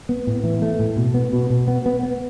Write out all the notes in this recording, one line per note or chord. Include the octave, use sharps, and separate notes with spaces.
B3
A2
E3
A3
A2
B2
B3
B2
B2
B3
B3
B3